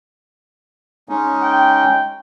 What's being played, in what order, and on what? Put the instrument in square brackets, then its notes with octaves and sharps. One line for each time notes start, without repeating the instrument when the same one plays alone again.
[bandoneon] G#3 C#4 D#4
[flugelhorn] G5